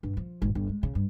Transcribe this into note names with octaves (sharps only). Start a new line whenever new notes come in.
G2
F3
G#1
G1
G#3
C#3
G2